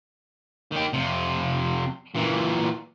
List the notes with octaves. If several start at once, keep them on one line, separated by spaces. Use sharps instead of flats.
D#3 G4
F2 C3
A#2 E3